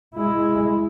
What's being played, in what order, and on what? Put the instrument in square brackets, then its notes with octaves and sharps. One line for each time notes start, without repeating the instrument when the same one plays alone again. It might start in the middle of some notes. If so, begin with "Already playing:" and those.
[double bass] G#3 E4